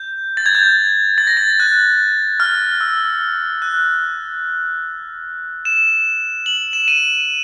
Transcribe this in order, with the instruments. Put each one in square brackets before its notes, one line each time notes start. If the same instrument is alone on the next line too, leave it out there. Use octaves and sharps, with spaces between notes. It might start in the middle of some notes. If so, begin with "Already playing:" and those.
Already playing: [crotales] G6
A6
G#6
G6
G#6
A6
A#6
A6
F#6
F6
E6
F#6
E7
F#7
E7
D#7